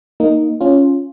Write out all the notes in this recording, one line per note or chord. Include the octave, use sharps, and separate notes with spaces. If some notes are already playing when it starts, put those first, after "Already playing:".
A#3 D#4
C#4 F4